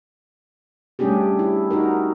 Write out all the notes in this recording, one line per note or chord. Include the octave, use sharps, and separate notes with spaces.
G3 A3 C#4 D4 G4 G#4
E4
D#4 F#4 A#4